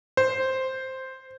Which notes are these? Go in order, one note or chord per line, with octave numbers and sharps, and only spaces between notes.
C5